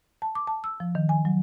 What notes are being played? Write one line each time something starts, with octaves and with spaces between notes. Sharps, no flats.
A5
D6
A5
E6
F3
D#3
G#5
F#3